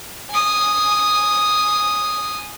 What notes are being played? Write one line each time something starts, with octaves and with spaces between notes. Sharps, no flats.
G#5 D#6